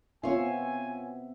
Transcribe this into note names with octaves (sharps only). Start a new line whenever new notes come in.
B3 C4 F4 C#5 E5 G#5